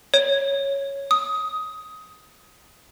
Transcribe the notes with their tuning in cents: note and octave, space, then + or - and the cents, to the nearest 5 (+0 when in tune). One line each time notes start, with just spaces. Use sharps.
C#5 +0
D#6 +15